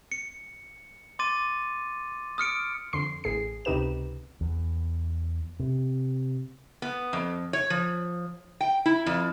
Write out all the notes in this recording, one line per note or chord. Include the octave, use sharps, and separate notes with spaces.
C#7
C6 D6 A6 D#7
D#6 F6 C#7 D7
F2 D3 C6 C7
A1 G#4 C7
C#2 C3 D#4 G4 B4 E7
E2
C3
B3
F2
C#5
F3
G5
E4
F2